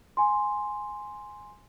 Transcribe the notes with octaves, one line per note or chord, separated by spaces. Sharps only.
G#5 C6